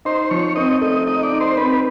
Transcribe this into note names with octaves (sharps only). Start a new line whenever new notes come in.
D#4 C5
F3 C#5
C4 D#5
A3 D#5
D#4 D#5
D5
D#4
C5
C4 B4